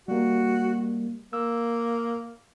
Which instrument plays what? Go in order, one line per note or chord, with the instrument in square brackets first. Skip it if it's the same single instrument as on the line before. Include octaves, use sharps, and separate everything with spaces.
[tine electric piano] G3 A#3 [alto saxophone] F#4
[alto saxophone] A#3 [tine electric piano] E6